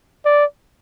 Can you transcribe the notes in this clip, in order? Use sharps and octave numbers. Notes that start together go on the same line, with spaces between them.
D5